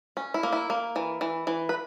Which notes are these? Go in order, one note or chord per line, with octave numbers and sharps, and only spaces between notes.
C#4
E4
A#3
E4
A#3
E3
E3
E3
B4